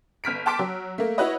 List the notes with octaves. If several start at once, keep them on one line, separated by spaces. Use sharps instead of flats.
G1 F6 B6 D7
G5 A5 C6 D6 B6 D7
F#3
A3 A#3
E4 F#4 B4 C#5 D#5